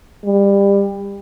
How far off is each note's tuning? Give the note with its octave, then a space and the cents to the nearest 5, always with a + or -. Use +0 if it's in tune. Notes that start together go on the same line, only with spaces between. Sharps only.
G3 +25